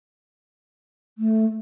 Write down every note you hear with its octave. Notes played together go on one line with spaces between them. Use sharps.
A3